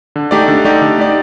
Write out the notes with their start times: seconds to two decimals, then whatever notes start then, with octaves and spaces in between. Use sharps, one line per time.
0.16 D3
0.31 A3 D#4 G4 D5
0.48 D3
0.65 A3 D#4 G4 D5
0.82 D3
0.98 A3 D#4 G4 D5